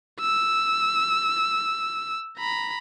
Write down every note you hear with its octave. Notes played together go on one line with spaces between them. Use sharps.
E6
A#5 B5